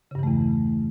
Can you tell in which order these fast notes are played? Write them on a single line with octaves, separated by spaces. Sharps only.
C#3 G2 E3 A3 E2